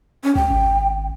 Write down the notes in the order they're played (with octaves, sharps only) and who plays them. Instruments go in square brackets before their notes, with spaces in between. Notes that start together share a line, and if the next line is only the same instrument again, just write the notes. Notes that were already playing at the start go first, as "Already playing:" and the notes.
[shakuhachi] C#4
[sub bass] C#2 [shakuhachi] G5
[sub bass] G#1